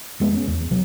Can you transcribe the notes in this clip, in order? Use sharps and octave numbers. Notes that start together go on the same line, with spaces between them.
F1 G#3 B3
C#4
E2
B1 C3 F#3